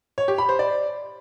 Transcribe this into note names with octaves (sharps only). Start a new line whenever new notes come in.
C#5
G4
B5
C5
D5